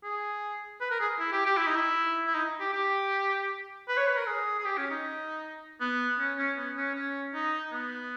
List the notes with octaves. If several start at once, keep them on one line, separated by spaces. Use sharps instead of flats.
G#4
B4
A#4
G#4
E4
G4
G4
E4
D#4
E4
E4
D#4
G4
G4
B4
C#5
B4
A#4
G#4
G#4
G4
C#4
D#4
B3
C#4
C#4
B3
C#4
C#4
D#4
B3